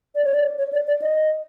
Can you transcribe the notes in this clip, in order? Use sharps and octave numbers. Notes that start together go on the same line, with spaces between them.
D5
C#5
D5
C#5
D5
D5
D#5